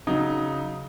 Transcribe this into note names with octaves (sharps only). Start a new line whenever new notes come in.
C#3 F#3 D#4